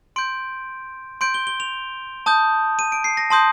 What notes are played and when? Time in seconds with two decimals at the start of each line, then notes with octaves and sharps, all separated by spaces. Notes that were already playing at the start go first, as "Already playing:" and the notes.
0.16 C6 G6 D7
1.21 C6 G6 D7
1.34 G7
1.47 G7
1.60 F7
2.26 A5 D#6 G6
2.79 D#7
2.92 D7
3.04 C7
3.17 A#6
3.30 A5 C6 D#6 G6